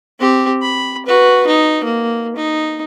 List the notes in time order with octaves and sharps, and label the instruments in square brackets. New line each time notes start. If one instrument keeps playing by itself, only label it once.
[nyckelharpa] C4 G4
B5
F#4 B4
D#4
A#3
D#4